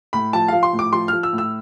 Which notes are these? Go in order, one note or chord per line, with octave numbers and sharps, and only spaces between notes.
A2 B5
F3 A5
F3 F5
C6
A2
D6
F3 C6
F3 F6
E6
A2
E6